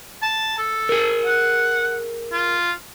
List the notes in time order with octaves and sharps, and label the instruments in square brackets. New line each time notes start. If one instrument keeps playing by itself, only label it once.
[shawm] A5
A4
[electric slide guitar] G#4 A#4
[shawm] F#5
F4